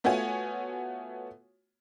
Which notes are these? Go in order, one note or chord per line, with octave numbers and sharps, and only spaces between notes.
A3 B3 F4 F#4 C#5 G#5